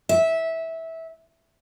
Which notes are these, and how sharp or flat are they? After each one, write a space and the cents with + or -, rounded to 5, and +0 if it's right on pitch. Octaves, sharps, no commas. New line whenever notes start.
E5 -15